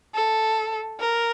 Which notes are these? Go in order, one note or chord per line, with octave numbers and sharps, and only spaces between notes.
A4
A#4